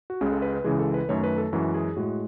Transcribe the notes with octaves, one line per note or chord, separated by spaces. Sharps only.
F#4
C#2 C#3 G#3 G#4
A4
B4
B4
C#2 C#3 E3 G#3 G#4
A4
B4
F#2 D#3 A3 C#5
B4
A4
F#2 E3 G#3 F#4
G#4
A2 G#3 F#4